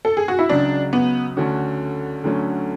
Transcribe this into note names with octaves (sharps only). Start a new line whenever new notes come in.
A4
G#4
F#4
E4
C#2 C#3 F#3 D4
B3
D2 D3 A3 C#4 F#4
D2 D3 F#3 A3 C#4